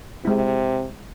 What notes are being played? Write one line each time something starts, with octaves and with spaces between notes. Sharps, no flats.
C3 G#3 E4